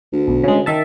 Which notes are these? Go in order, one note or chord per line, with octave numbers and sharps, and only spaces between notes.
D2
B1
C#3 G#3
D#3 E5 A5